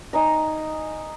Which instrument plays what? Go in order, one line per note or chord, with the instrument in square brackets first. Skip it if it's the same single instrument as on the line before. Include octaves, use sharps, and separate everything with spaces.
[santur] D#4 G#5 A#5